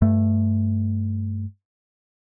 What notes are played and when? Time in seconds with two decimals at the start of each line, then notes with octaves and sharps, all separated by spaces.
0.02 G2 A3